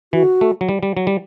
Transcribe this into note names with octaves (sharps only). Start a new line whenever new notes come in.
E3 F#4
A3
F#3
G3
G3
F#3
G3